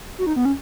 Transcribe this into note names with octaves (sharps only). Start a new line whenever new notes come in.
F#4
D#4
B3
C#4